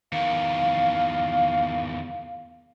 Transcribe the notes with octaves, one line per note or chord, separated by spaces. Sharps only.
E2 D#3 F5